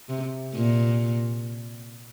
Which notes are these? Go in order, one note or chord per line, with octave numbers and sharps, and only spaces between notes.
C3
A#2